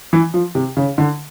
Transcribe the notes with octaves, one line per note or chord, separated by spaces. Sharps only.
E3
F3
C3
C#3
D3